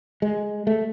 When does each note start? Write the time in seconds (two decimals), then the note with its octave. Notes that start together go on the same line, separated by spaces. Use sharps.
0.22 G#3
0.67 A3